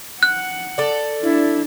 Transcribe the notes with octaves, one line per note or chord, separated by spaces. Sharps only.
F#5 F#6
A4 D5
D4 E4